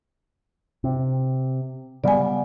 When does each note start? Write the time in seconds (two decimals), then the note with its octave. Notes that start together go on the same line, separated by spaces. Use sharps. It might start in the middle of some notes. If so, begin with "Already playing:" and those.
0.84 C3
2.04 C#3 G3 B3 D5 G#5